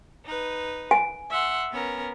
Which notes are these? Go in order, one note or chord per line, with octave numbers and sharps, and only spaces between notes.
D#4 B4
G#5
E5 F#5 C6
B3 C#4 A#4